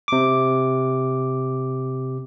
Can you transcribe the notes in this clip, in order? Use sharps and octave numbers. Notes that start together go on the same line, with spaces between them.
C3 D6